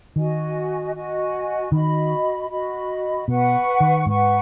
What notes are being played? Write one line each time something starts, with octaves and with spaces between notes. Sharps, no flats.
D#3 F#4 D#5 G#5
F#4 D#5 G#5
D#3 F#4 D#5 B5
F#4 D#5 B5
B2 B4 F#5 C#6
D#3
G#2 B4 F#5 C#6